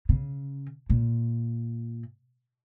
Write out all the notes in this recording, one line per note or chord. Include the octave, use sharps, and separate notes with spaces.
C#3
A#2